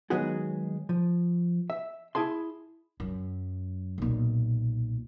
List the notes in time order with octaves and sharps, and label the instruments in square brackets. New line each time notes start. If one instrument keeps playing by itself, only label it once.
[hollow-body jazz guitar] D#3 F#3 G#3 B3 F#4 G#4
F3
E5
E4 G#4 A5 C6
[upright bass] F#2
B1 A#2